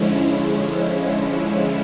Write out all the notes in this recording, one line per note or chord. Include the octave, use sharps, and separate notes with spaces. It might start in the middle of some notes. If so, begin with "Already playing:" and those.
Already playing: D3 F3 G#3 C#4 E4